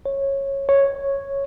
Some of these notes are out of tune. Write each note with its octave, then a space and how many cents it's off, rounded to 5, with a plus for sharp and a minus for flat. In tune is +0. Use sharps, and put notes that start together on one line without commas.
C#5 -15
C#5 -5